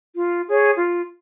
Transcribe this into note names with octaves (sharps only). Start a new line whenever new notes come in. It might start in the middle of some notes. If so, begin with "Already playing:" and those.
F4
G#4 C#5
F4